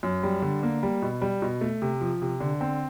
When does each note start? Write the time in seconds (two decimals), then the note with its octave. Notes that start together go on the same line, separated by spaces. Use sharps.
0.03 F#2
0.23 G3
0.42 D3
0.63 A#3
0.83 G3
1.02 B2
1.22 G3
1.42 B2
1.61 A3
1.82 C3
2.01 F3
2.22 C3
2.40 D3
2.61 C4